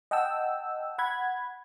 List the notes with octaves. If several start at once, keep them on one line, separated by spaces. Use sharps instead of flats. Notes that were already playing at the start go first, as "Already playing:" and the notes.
D#5 F#5 G5 A5 E6
F#5 B5 G#6